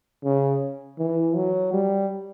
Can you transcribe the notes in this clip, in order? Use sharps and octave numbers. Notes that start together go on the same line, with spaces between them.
C#3
E3
F#3
G3